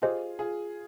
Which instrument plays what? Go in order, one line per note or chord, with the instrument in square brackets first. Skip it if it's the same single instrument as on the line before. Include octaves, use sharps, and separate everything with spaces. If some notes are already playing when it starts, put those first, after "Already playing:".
[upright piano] F4 G#4 [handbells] G4 C5 D#5
[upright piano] F4 G#4